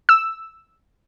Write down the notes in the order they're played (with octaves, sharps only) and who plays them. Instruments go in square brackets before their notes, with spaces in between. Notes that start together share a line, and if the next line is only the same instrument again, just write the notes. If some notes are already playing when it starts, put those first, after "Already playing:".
[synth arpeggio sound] E6